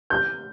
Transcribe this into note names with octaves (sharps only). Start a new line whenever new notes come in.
G6